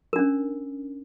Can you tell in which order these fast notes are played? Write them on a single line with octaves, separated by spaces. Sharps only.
A#4 D4 C#4